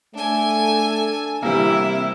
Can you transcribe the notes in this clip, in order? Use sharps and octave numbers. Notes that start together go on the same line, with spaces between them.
A3 D4 A4 G#5
C3 E3 G3 A#3 E4 E6